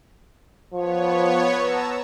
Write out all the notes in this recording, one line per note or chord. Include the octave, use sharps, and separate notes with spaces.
F3 B3 C#5
A5 A#5 E6